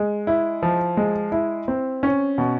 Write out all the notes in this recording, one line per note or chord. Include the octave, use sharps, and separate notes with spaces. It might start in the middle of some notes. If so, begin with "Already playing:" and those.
Already playing: G#3
E4
F3
G#3
E4
C4
C#4
B2